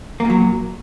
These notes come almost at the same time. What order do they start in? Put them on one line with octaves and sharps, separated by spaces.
A#3 A#2 F#3